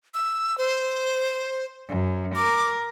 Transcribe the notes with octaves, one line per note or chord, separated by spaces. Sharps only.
E6
C5
F#2
A#4 D6